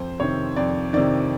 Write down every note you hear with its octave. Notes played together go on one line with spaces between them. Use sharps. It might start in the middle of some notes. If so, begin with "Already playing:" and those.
Already playing: F2 C5
C3 D#3 C#5
F2 D5
C3 D#3 D5